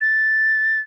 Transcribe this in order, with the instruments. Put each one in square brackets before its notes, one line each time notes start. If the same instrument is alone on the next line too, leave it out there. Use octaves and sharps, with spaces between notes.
[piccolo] A6